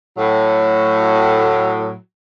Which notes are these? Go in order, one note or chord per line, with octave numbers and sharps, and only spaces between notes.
A2 F#3